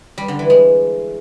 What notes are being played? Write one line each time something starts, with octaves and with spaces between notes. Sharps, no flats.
G3
D3
E3
G#3